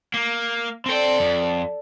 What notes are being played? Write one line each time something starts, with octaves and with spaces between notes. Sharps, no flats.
A#3
C4 A4 D5 G5
F2